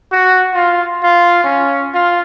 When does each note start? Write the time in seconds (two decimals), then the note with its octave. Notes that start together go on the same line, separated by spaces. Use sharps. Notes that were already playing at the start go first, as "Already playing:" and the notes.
0.12 F#4
0.54 F4
1.03 F4
1.44 C#4
1.94 F4